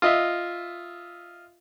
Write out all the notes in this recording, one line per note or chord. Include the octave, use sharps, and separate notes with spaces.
F4 D#5 E5